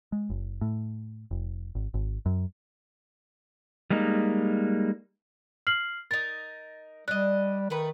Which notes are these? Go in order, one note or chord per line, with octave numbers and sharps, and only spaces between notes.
G#3
F#1
A2
F1
G#1
G#1
F#2
G3 G#3 A#3 D#4
F6 C7 F#7
D#4 A#4 A6
G3 D4 D#5 F#6
D#3 A3 B4